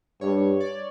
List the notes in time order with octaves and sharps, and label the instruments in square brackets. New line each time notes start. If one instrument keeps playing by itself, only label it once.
[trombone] G2 [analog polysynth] C#5
[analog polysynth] D5